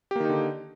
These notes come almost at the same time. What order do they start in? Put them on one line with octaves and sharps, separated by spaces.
G4 A#3 D#3 D#4 D3